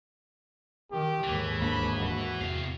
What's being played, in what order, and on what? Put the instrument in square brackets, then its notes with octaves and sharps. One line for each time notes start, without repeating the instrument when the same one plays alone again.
[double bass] D#3 [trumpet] G4
[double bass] D#2 G#2 [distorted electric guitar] E3
[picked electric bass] D1 A#3 D4 [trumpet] B5
[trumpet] F#4
[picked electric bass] E2 [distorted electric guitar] C3 F5